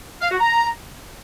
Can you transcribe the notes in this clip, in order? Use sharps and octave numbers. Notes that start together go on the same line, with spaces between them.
F5
F#4
A#5